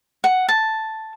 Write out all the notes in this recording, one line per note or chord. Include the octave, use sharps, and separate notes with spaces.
F#5
A5